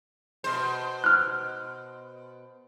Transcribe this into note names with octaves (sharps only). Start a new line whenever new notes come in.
B2 C5
F6 F#6